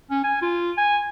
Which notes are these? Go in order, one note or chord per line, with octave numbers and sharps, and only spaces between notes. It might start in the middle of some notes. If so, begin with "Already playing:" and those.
C#4
G#5
F4
G#5